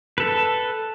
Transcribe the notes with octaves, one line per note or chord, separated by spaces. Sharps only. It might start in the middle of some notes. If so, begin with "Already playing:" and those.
A4 B4